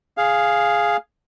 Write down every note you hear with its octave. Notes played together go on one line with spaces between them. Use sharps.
G#4 F5